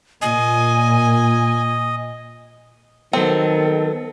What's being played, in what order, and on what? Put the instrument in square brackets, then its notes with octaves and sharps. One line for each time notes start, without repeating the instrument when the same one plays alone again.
[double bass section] A#2 [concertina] D#5 [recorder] G#5
[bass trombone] D#3 [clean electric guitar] F#3 B3 [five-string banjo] C4 [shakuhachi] A4